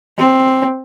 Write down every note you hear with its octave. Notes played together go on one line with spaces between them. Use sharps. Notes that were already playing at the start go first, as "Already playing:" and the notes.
C4